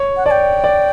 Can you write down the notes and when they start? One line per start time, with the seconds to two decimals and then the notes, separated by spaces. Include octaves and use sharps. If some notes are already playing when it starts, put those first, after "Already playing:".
Already playing: C#5
0.17 F#5
0.26 D5 A5
0.31 G5
0.64 D5